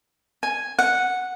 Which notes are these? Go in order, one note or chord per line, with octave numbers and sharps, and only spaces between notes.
G#5
F#5